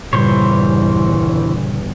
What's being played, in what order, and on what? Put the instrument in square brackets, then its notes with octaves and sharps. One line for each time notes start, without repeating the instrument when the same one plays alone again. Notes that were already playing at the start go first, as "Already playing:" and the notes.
[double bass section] G1 E2 [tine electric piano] A#2 C#3 G3 [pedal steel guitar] E3 C5 C#5